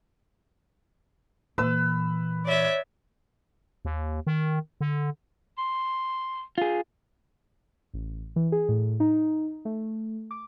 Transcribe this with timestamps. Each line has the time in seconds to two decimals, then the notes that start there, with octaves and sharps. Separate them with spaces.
1.58 A#2 E3 B4 E6
2.45 C#5 D5 E5
3.85 D#2
4.27 D#3
4.81 D3
5.58 C6
6.58 F4 G#4
7.94 A1
8.36 E3
8.52 G#4
8.69 A2
9.00 D#4
9.65 A3
10.31 D6